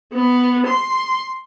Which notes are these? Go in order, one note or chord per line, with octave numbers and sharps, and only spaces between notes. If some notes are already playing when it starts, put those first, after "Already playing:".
B3
C6